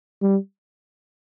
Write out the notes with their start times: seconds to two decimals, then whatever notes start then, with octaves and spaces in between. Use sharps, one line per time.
0.22 G3